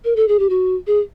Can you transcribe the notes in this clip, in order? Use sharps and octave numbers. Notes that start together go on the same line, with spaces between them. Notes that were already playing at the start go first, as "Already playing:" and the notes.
A#4
A4
G#4
G4
F#4
G#4